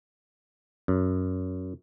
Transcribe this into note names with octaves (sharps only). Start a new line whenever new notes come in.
F#2